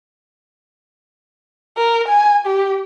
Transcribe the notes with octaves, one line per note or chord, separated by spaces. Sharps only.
A#4
G#5
G4